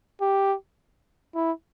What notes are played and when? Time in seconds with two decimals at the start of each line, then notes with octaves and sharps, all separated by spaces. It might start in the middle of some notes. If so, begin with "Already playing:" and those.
0.21 G4
1.35 E4